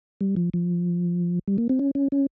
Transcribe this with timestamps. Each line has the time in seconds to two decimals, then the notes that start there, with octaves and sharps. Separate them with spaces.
0.21 G3
0.36 F3
0.54 F3
1.48 G3
1.58 A#3
1.69 C4
1.79 C#4
1.95 C#4
2.12 C#4